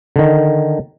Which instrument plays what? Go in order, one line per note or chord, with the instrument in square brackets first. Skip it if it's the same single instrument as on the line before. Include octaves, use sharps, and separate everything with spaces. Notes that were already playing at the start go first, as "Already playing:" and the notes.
[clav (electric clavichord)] D3 D#3